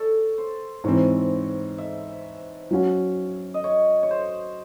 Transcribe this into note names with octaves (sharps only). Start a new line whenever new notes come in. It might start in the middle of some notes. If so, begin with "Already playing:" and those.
Already playing: A4 C#5
C5
G#2 E3 C4 C#5
E5
F#3 C#4 F#4
D#5
C#5
C#5
C5